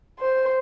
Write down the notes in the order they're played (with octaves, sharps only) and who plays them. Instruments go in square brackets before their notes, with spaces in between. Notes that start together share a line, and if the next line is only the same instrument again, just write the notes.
[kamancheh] C5